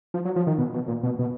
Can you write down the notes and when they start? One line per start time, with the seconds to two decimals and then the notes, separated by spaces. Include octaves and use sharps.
0.14 F3
0.25 F#3
0.36 F3
0.47 D#3
0.58 B2
0.74 B2
0.88 A#2
1.03 B2
1.19 B2